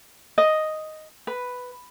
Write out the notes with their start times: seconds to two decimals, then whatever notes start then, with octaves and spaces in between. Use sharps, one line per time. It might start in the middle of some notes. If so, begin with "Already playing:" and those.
0.38 D#5
1.27 B4